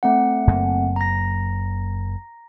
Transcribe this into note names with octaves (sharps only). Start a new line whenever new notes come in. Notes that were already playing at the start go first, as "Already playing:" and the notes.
A3 C4 F#5
F#1 F#2 A#3
A#5 A#6